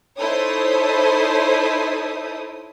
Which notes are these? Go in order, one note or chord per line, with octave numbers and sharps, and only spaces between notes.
D#4 E4 A4 C5 C#5 D#6